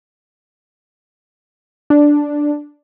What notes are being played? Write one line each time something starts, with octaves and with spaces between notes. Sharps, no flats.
D4